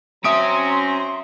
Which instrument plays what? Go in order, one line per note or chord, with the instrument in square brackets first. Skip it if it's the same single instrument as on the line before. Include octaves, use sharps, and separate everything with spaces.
[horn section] F#3 C4 A#5 [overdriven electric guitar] C#4 [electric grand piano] E5 D#6 D7 [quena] C6